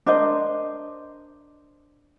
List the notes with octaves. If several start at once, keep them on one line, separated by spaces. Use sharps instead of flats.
D4 A#4 C5 D#5